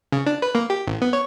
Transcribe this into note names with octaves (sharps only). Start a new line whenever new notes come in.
C#3
D4
B4
A#3
G4
A1
B3
C#5